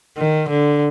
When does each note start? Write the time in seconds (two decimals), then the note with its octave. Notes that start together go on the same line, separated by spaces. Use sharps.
0.18 D#3
0.49 D3